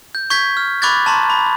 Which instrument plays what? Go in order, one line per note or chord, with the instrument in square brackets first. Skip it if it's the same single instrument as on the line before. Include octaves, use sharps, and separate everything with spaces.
[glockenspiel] G6
C#6 G6 G#6 B6
F6
B5 C#6 D6 F#6 G#6 A6
A5 A#5 C6 C#6
B5